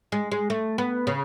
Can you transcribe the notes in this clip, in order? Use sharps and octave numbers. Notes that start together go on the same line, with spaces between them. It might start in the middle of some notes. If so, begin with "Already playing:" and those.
G#3
G#3
A3
B3
C#3